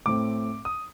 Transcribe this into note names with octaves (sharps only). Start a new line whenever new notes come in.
A2 A3 C4 D6
D#6